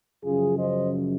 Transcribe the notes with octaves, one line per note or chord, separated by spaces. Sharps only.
F#2 C#3 F3 F4 G#4
C5 D#5